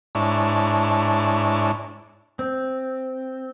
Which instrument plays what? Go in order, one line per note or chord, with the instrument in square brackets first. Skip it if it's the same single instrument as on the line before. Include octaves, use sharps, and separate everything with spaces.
[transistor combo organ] G#2 D4 E4 C#5 A5
[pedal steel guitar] C4